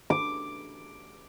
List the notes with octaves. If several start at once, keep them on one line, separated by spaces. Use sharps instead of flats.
D6